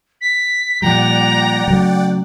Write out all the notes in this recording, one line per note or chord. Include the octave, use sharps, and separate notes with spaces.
B6
A#2 F3 G3 D5 F#5 G5 A#5
C#3 F#3 A3